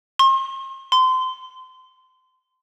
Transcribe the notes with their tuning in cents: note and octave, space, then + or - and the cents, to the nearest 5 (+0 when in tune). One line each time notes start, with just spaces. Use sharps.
C6 +40
C6 -25